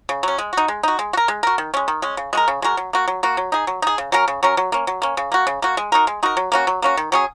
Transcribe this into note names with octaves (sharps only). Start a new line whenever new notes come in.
C#3
F#3 C#4
G#3
D#4 F#4
G#3
D#4 F#4
G#3
F#4
A#4
G#3
F#4 A#4
D#3
G#3 C#4
D#3
G#3 C#4
C#3
G#3 F#4 A#4
C#3
G#3 F#4 A#4
F#3
A#3 F#4
F#3
A#3 F#4
F#3
D#4 G#4
F#3
D#4 G#4
C#3
F#3 C#4 A#4
C#3
F#3 C#4 A#4
F#3
A#3 C#4
F#3
A#3 C#4
C#3
A#3 F#4
C#3
A#3 F#4
G#3
D#4 F#4 A#4
G#3
D#4 F#4 A#4
F#3
A#3 C#4 F#4
F#3
A#3 C#4 F#4
D#3
F#3 C#4 G#4